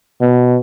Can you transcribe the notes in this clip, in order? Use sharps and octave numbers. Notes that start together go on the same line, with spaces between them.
B2